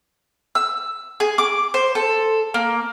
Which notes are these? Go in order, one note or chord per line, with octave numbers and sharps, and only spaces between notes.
E6
G#4
D6
C5
A4
A#3